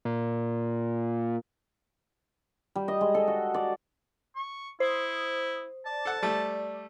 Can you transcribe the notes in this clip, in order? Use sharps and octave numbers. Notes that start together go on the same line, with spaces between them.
A#2
G3
D#5
G#3
A4
F#4
D5
C#6
E4 C5 D#6
D5 A5
A4 F#5
G3 A3